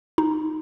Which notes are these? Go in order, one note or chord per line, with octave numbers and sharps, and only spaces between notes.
D#4